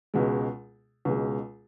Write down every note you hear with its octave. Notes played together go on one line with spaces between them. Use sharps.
C#2 B2 G#3
C#2 B2 G#3